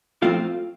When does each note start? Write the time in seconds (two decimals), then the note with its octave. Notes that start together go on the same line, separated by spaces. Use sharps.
0.22 A2 F3 A3 C4 F4 F5